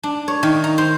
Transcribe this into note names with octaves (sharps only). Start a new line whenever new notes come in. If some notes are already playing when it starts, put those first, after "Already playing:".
D4
C#5
D#3
A#5
C5